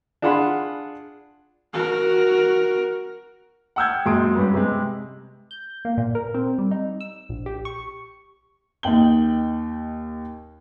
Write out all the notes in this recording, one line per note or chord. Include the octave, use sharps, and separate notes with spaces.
D4 F4 G#4 F#5 B5 C6
F#4 A#4
F#5 G5 E6 F6 G6 G#6
F#2 A#2 G#3 C6 D#6 D7
G2 B3 C#4
C3 G#3
G6
A#3
A#2
A#4
C4
G3
D#4
E6
A#1
G4
C#6
D#2 D#4 D#5 G5 F#7 G7